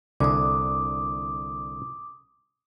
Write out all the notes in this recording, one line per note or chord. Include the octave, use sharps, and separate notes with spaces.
C2 D3 G#5 D6 D#6